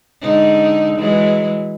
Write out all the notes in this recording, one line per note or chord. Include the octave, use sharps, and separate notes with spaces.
D3 G#3 D#4
E3 F#3 G#3